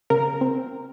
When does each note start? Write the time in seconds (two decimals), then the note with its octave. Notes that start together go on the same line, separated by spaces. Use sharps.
0.10 C#3 A#4
0.41 C4